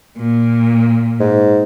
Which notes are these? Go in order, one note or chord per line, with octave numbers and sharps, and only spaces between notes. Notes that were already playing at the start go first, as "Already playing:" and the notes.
A#2
G#2